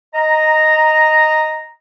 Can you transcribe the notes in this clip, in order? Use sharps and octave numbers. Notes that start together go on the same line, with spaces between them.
D#5 A#5